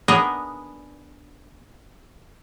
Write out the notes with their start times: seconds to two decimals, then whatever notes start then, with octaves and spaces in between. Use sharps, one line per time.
0.08 B3 D4 G#4 A#4 D#5